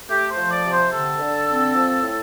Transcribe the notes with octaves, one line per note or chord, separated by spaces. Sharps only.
A3 G4
C5
F3
D5
C3
C5
D3 A4
D3
C4
F3
A2